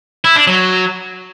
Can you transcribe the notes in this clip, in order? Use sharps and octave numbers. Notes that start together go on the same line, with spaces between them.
E4
D4
F#3